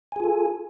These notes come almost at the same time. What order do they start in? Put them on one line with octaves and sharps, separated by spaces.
G#5 G#4 F4 A4